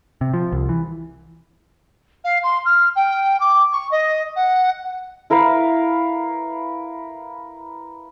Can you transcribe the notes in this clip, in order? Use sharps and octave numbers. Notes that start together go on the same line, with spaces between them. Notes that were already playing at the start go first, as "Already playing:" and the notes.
C3
F3
C2
E3
F5
C6
F6
G5
D6
C#6
D#5
F#5
E4 A#4 B4 F5